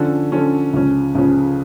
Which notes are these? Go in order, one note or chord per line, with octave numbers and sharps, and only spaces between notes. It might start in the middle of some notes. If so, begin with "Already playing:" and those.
Already playing: D3 F3 C#4 F4 A4
D3 F3 C#4 F4 A4
C#2 C#3 F3 C#4
C#2 C#3 F3 C#4